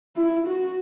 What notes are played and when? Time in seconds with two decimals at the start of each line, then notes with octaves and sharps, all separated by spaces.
0.16 E4
0.46 F#4